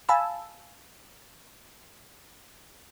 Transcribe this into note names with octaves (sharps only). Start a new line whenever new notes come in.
F5 G#5 A5 B5 E6